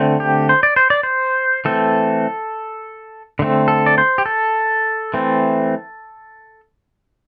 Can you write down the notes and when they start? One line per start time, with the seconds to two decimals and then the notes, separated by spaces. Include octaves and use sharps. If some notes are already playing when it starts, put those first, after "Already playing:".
Already playing: D3 A3 C4
0.20 G4
0.49 C5
0.63 D5
0.76 C5
0.90 D5
1.03 C5
1.65 E3 A3 C4 A4
3.39 D3 A3 C4
3.68 A4
3.86 D5
3.98 C5
4.18 G4
4.26 A4
5.14 E3 A3 C4